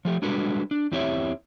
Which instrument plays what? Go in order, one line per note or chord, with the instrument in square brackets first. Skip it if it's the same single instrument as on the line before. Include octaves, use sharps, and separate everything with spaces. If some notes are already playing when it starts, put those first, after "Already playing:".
[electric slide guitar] F3 A3 G4
G3 G#3 D4 F#4 A4 B4
D4
E2 C4 E4 G4 C#5 E5